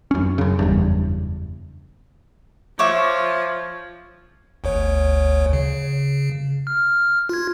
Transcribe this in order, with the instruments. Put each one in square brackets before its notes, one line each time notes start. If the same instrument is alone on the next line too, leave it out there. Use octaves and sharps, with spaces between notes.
[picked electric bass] F#2 C#4
F#2 C#3
F#1 E2 G2
[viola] F3 [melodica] C#5 [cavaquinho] E5 C#6 D6
[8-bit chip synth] G1 D2 C#5
C#3
F6
F4 G#6